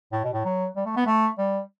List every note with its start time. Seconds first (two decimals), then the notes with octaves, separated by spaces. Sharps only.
0.12 A2
0.24 B2
0.33 A2
0.45 F#3
0.76 G3
0.85 A3
0.97 B3
1.06 A3
1.38 G3